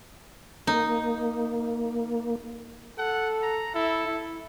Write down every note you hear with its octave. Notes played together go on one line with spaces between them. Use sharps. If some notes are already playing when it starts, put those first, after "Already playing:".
A#3 D#4
A4 F#5
A#5
E4 A4
E4